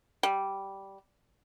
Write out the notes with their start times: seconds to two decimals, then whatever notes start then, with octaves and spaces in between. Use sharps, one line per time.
0.23 G3